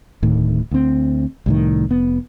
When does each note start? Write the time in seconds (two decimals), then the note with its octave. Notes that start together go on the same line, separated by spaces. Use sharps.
0.22 D1 A2 D#3
0.71 D2 C4
1.46 C2 A2 D#3
1.89 F1 B3